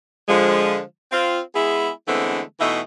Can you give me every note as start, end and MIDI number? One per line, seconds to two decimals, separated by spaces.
0.29 0.81 50
0.29 0.81 53
0.29 0.81 56
1.12 1.41 60
1.12 1.41 65
1.55 1.90 56
1.55 1.90 59
1.55 1.90 64
1.55 1.90 68
2.08 2.41 50
2.08 2.41 52
2.08 2.41 56
2.08 2.41 57
2.08 2.41 59
2.08 2.41 60
2.60 2.80 47
2.60 2.80 52
2.60 2.80 57
2.60 2.80 63
2.60 2.80 76